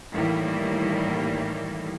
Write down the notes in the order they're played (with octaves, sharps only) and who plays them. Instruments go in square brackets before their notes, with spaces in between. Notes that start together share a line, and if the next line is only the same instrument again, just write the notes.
[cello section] A2 D#3 E3 G3 A#3